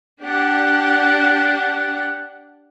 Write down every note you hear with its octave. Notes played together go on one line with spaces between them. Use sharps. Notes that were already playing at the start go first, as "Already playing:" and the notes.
D4 G4 F#5